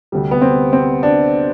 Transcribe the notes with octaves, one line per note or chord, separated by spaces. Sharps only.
D2 C3 G3
B3
C4
C4
D4